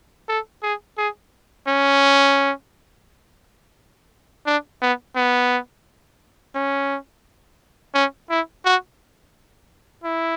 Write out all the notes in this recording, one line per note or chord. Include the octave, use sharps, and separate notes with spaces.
A4
G#4
G#4
C#4
D4
B3
B3
C#4
C#4
E4
F#4
E4